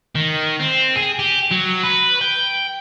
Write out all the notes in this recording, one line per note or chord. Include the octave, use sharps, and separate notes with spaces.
D#3
C4
G#4
G4
F#3
B4
G5